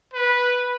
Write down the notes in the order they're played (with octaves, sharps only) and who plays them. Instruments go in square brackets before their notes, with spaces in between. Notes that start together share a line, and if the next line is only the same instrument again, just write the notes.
[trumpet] B4